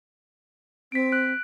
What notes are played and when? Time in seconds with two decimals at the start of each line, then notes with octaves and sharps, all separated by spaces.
0.92 C4 B6 D7
1.12 F#6 D7